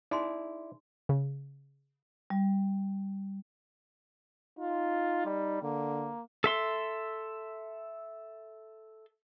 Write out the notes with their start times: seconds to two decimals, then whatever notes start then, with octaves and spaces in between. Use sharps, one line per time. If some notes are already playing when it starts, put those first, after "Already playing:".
0.11 D#4 E4 G#4 D5 C6
1.09 C#3
2.30 G3
4.59 D#4 F4
5.26 G3
5.62 D3 A#3
6.44 A4 E5 C6